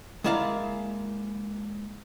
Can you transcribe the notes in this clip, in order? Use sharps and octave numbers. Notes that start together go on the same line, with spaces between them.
G#3 A#3 E4 D5 F5 A#5